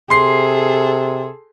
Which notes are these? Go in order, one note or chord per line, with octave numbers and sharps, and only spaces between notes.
C3 G#4 A4 C6 C7